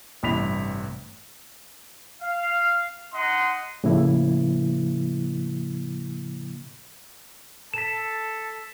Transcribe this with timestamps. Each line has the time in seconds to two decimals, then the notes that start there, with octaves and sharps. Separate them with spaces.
0.23 A1 G2 C3 B5 B6 F7
2.22 F5
3.14 D#4 D#5 F#5 C6
3.84 A2 C#3 F3 A#3 E4
7.74 A4 A5 B6 E7